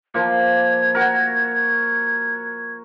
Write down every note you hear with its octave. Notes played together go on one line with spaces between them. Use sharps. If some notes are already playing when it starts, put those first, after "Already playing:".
F3 A#3 G#6
F#4 A#4